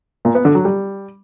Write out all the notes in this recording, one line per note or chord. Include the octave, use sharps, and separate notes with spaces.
A#2
B3
D3
F#3
G3